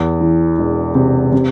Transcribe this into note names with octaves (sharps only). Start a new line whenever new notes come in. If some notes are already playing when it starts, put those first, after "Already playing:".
Already playing: E2
E3
E1
C3
C3